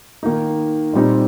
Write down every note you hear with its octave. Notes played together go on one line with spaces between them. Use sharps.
D#3 A#3 D#4
A#2 G3 C4 D#4